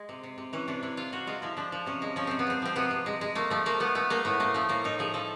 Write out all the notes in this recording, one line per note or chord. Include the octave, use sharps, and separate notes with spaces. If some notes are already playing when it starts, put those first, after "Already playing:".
Already playing: G#3
C3
C3
C3
E3 C#4
C3 D4
C3 E4
C3 F4
C3 F#4
G#3 F4
F3 E4
F3 D4
F3
C3 C#4
G#3
F3 C#4
C3 C4
B3
C3 C4
F3 C4
C3 B3
C3
G#3
G#3
A3 A#3
F3 A3
F3 A#3
A3 B3
A3 B3
A3 A#3
A2 B3
A3 A#3
F3 A3
A2 A#3
A2 D#4
F3 G#4
F3 A4